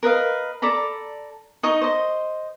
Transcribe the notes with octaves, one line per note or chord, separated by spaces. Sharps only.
A#4 B4 D#5 F5
A4 D5 A#5 B5
D#4 D#5 C#6
C5 D#5